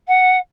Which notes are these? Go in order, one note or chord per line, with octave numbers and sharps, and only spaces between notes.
F#5